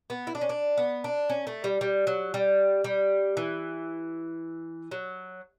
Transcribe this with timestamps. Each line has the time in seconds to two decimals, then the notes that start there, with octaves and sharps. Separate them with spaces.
0.10 B3
0.27 E4
0.35 D4
0.41 C#4
0.49 D4
0.78 B3
1.04 D4
1.30 C#4
1.47 A3
1.64 G3
1.81 G3
2.07 F#3
2.34 G3
2.84 G3
3.37 E3
4.91 F#3